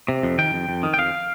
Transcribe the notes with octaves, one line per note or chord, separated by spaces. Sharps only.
C3
F2
D#3 G5
F2
F2
D#3
G5
F2 F5